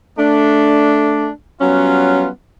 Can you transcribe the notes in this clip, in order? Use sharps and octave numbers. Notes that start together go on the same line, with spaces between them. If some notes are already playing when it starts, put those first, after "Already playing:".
A3 D4
F#3 G3 B3 C#4 F4